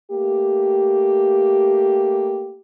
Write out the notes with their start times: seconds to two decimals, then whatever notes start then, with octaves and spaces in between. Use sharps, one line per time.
0.11 A3 A#3 G4